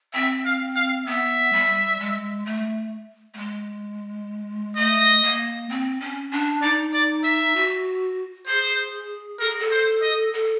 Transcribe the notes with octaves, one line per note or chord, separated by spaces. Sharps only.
C4 E5
F5
F5
B3 E5
G3
G#3
A3
A3
G#3
A3 D#5
A#3
C4
C#4
D4
D#4 D5
D5
E5
F#4
G#4 C5
A4 A#4
G#4
A4
C5
D#5
A4